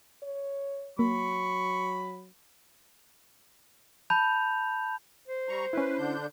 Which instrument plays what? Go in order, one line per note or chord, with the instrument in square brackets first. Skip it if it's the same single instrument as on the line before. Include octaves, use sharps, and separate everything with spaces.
[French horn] C#5
[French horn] F#3 [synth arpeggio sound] A#3 [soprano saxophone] B5 [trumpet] C#6
[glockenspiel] A5 B5 G6 F7
[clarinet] C5
[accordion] G3 A#5 C#6
[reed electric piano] C#4 E4 [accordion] B4
[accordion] D3 D4 G6